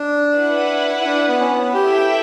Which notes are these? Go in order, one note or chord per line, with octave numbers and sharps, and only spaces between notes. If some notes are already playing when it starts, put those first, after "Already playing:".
Already playing: D4
E4 B4 F#5
D4
B3
C#4
B3
E4 G4 A4 E5 G5